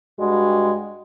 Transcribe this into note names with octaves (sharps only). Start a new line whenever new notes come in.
G2 G3 G#3 F#4